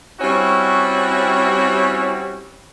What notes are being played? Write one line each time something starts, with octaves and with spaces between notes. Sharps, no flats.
G3 C4 C#4 E4 F#4